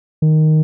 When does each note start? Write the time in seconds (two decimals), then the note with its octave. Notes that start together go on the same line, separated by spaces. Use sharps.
0.22 D#3